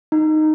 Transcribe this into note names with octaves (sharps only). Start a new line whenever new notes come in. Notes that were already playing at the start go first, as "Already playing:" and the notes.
D#4